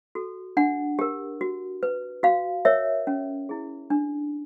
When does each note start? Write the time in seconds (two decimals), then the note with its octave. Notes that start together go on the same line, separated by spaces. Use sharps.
0.15 F#4 A4
0.57 D4 F#5
0.99 G4 A#4
1.41 F#4
1.83 B4
2.23 F#4 F5
2.65 A#4 C#5 E5
3.07 C#4
3.49 E4 G#4
3.90 D4